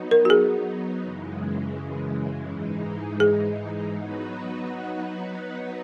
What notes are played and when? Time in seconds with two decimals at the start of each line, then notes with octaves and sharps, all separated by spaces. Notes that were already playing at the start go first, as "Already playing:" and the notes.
Already playing: F#3 B3 D#4
0.11 A#4
0.25 F#4
0.30 G#4
1.02 F#2 C#3 E3 G#3
2.47 G#2 E3 G#3 D#4
3.20 G#4
3.93 F#3 B3 D#4 F#4 B4